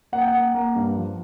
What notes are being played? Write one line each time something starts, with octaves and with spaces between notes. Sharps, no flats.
A#3 F#5
G5
F#5
A#3
A#3
G2
F3